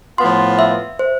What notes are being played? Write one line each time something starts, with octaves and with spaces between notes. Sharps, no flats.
A2 F3 B3 F4 C6
E5
C5